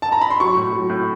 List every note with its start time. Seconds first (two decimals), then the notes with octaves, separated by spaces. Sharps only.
0.02 A5
0.12 A#5
0.22 B5
0.30 C6
0.40 F#3 C#6
0.57 A2
0.73 F#3
0.90 A2